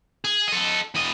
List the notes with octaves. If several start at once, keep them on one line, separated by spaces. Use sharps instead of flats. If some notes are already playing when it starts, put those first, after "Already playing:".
G#4
A4 D#5
E2 D#5